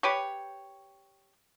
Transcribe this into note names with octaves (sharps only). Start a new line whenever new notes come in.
G4 B4 C#5